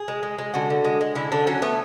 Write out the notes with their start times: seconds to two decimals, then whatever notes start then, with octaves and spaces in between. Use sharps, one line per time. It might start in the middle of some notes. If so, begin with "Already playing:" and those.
Already playing: G#4
0.08 G#3
0.23 G#3
0.38 G#3
0.54 D3 F#4
0.70 D3
0.85 G#3
1.01 G#3
1.15 D3 E4
1.32 D3 D4
1.47 F#3 C#4
1.62 A3 B3